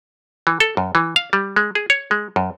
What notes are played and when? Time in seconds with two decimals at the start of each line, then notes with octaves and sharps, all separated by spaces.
0.47 E3
0.60 A4
0.77 F#2
0.95 E3
1.16 F5
1.33 G3
1.56 G#3
1.75 G#4
1.90 C#5
2.11 G#3
2.36 F#2